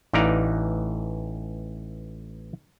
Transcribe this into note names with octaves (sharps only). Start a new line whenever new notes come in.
A1 E3 D#4 D5 F5 A#5